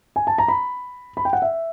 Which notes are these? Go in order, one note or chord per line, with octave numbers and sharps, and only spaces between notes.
G#5
A5
A#5
B5
B5
G5
F#5
E5